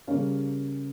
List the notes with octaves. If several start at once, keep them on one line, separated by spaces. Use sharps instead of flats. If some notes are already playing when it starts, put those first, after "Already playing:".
C#3 G3 A#3 C#4 F5